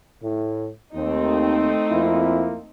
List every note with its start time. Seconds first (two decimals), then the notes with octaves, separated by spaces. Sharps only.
0.22 A2
0.95 D#2 A3 C4 D#4
1.90 F2 A#3 E4